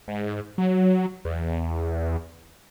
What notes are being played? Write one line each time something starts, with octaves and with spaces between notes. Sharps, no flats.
G#2
F#3
E2